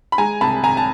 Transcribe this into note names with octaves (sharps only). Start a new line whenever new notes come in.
B5
G#3 G#5 A#5
C2 A5 B5
C2 G#5 A#5
A5